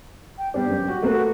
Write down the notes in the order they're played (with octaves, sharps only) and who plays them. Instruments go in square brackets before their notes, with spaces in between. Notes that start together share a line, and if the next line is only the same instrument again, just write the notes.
[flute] G5
[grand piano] G3 B3 D4 [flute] G4
[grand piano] G1 F#2
F#4
[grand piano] A3 A#3 B4 [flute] F#4